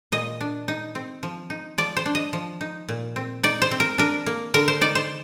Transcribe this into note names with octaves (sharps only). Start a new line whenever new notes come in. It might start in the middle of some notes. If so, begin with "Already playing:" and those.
A#2 D#5
D4
D#4
C4
F3
D#4
F3 D5
C5
D4
D#5
F3
D#4
A#2
C4
D#4 D5
C5
C4
A#4
D4 A#4
A#3
D3 A#4
C5
D#4 D5
C5